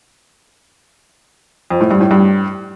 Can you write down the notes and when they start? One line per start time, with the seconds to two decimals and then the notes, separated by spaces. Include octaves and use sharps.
1.70 F2
1.81 A2
1.91 G2
2.01 A2
2.11 G2